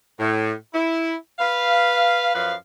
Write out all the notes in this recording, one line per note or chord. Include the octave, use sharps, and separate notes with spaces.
A2
E4
B4 F5
F#2 F3 B4 F5